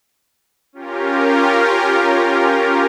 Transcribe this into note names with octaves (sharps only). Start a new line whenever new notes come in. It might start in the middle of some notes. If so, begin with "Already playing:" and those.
C#4 F4 G4 A#4